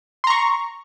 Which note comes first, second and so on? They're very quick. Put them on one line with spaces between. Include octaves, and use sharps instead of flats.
C6 A#5 C#6